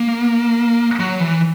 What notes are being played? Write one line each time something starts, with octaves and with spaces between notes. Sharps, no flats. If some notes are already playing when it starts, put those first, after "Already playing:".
Already playing: A#3
F#3
E3